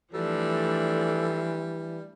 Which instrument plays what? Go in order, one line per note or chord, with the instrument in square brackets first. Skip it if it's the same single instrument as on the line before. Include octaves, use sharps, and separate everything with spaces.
[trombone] E3 [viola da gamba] F3 A3 D4 [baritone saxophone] G3 [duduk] A4